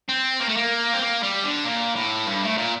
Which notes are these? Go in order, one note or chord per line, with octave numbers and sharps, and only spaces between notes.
C4
A#3
A3
A#3
C4
A#3
G3
D3
A#2
A2
G2
A2
A#2